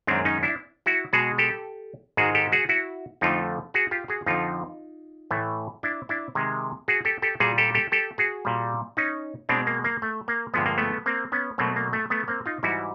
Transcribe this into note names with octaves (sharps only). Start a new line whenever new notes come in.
F#2 D#3 G#3 C4 D4
C#4 D#4
D4 E4
E4 F#4
B2 G#3 F#4 G#4
G4 A4
G#2 D#3 G#3 F#4 G#4
G4 A4
F#4 G#4
E4 F#4
F2 D3 F3 A3 D#4 F4
F#4 G#4
F4 G4
F#4 G#4
F2 D3 F3 D#4 F4
A2 E3 A3
D4 E4
D4 E4
C3 D#3 G#3
F#4 G#4
G4 A4
G4 A4
A#2 G3 F#4 G#4
G4 A4
G4 A4
G4 A4
F#4 G#4
A#2 G3
C#4 D#4
B2 G#3 C4 D4
A#3
A#3
A3
A#3
G2 D3 F3 G#3 B3
A#3
A3 B3
A#3 C4
B3 C#4
B2 F#3 A3 A#3 C4
A#3
A3
A3 B3
A#3 C4
D#4 F4
G#2 E3 G3 E4 F#4